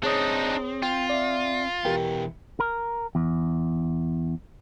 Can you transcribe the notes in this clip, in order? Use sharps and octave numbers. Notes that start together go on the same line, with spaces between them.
C4 D4 D#4 G#4 C#5 D#6
F4 G5
D5 E5
B2 E3 B3 G4 A#4 G5
A#4
E2